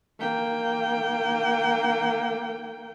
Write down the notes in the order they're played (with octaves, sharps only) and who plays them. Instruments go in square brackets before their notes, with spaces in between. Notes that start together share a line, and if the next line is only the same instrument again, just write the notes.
[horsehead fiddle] A#3 G5